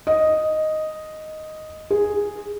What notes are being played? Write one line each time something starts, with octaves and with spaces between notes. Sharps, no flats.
D#5
G#4